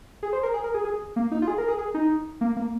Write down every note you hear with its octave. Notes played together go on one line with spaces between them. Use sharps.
G#4
C5
A#4
G#4
A#4
G#4
G#4
A#3
D#4
F4
G#4
A#4
G#4
G#4
D#4
A#3
A#3